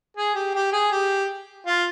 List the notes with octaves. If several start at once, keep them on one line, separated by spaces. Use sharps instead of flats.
G#4
G4
G4
G#4
G4
F4